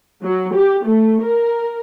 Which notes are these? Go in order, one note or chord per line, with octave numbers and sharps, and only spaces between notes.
F#3
G4
A3
A#4